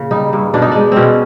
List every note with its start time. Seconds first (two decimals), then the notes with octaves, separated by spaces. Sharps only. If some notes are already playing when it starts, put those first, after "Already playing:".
Already playing: A#2 C#3
0.11 G3 D#4
0.33 G2
0.54 B2 D4
0.62 D#4
0.72 G#3 D4
0.92 B2 C4 C#4